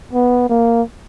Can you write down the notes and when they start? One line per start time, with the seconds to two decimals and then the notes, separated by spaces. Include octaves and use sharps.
0.13 B3
0.49 A#3